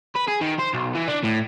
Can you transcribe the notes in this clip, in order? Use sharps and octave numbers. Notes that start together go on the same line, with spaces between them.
B4
G#4
D#3
C5
B1
E3
D4
A2